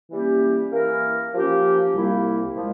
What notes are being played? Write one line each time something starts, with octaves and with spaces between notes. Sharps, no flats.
E3 G3 A#3 C#4 G4
E3 A#3 E4 A#4
F3 A#3 C#4 G4
C2 C3 G3 A#3 E4
A#2 F3 G#3